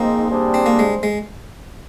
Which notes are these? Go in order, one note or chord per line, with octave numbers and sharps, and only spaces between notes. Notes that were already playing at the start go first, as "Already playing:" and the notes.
Already playing: G#2 F3 G#3 A#3 C4 D#4
C3 G3 D4 G#4 C5
C4
A#3
G#3
G#3